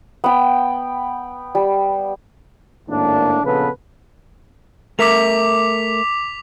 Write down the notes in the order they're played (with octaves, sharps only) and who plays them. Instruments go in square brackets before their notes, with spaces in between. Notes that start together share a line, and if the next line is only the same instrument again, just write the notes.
[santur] B3 G5
G3
[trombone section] G#1 A2 A#3 D4
A#1 C#3 B3 A4 B4
[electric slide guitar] A3 A#4 E5 [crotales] D6 B6 F7